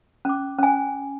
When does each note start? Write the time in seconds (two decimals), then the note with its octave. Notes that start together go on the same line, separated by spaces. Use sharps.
0.25 C#4 D6
0.59 C#4 G#5